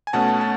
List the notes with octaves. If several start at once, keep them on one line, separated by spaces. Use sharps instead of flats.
G#5
B2 A3 C#4 F#5 A5
A5